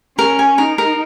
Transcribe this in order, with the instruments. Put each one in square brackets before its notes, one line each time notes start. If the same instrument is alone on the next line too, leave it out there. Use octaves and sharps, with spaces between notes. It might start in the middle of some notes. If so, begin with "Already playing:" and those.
[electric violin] C#4 [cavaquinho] A#4
[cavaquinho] G#5
[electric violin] D#4 [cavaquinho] A#4
[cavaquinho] A#4